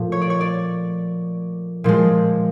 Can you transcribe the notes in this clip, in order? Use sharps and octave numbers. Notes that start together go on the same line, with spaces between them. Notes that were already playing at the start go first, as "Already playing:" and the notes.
Already playing: A#2 F3 A3
C#5
D5
C#5
D5
A#2 F3 G#3